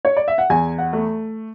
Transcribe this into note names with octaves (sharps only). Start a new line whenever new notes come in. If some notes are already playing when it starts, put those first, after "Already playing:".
C#5
D5
E5
F#5
E2 G#5
F#5
A3